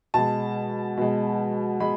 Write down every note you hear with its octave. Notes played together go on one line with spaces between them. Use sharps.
B2 G#3 A5
B2 G#3
G#3 B5